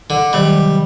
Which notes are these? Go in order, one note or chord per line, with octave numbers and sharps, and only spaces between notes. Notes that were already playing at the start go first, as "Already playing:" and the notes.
D3
C3 D#3 F#3 G3